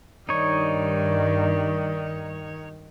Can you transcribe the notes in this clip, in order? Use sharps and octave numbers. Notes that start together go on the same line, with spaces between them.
G2 D#3 D#4 C#5 D5